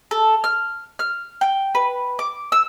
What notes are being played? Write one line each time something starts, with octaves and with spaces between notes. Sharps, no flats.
A4
F6
F6
G5
B4
D6
E6